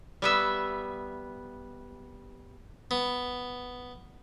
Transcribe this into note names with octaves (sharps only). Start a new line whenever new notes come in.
G3 B3 E5
B3